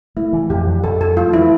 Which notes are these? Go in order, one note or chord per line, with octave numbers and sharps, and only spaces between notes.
A3 E4
E3
F2 G4
F2
F2 A4
F2 A4
A3 F4
E3 E4